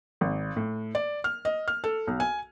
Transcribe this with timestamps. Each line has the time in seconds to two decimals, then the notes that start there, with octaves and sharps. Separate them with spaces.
0.21 G#1
0.56 A2
0.95 D5
1.24 F6
1.45 D#5
1.68 F6
1.84 A4
2.07 B1
2.20 G#5